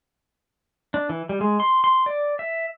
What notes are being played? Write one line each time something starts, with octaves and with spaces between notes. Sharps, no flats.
D4
E3
G3
G#3
C6
C6
D5
E5